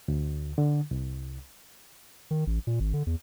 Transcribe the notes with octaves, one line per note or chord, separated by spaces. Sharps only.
D2
D3
C2
D#3
A1
A#2
G#1
D3
E2